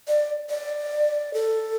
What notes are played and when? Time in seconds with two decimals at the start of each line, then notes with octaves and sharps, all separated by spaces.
0.08 D5
0.50 D5
1.34 A4